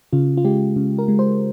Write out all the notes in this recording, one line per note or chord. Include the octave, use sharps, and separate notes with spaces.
C#3 F4
F4
G#3 G4
C#3
A#4
G#3
C5